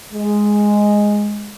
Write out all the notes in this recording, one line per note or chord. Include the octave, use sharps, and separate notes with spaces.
G#3